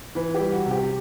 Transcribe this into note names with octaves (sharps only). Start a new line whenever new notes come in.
E3 B4
G4
G3
F#4
C3
G4